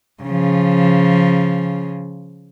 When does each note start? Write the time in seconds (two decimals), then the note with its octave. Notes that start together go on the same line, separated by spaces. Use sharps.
0.23 C#3 F3